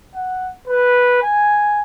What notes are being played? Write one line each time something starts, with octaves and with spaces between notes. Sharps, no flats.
F#5
B4
G#5